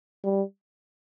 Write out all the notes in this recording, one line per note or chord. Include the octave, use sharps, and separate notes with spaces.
G3